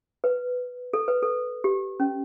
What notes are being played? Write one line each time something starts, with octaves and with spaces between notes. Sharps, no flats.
B4
A4
B4
A4
G4
C#4